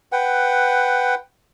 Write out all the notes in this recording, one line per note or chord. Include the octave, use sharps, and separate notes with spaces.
B4 F#5 G5